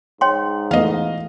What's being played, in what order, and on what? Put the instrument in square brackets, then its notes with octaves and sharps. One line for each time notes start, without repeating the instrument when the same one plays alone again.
[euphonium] G#2 [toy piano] C#5 G5 C6
[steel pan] E3 A3 B3 [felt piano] D#5 F5